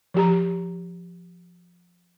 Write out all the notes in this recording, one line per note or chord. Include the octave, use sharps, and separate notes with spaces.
F3 G4 A#5